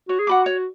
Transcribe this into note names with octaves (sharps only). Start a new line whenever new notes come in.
F#4 C#5
G#4
F#4 F#5 B5 D6
C#5